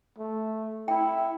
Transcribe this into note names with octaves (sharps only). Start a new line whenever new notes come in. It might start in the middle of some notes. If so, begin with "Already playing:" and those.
A3
E4 G5